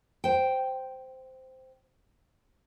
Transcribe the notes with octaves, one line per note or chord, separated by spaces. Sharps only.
C5 G5